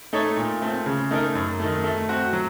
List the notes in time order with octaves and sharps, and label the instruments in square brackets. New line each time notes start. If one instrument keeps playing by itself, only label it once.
[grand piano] A3 D#4 A4 C#5
A#2
A3 C4
C#3
A3 D#4 A#4
F#2
D#3 A3
A3
C4 F#4
F#3